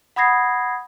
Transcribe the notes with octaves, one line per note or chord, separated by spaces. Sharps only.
F#5 B5 D#6 G#6 A#6 C7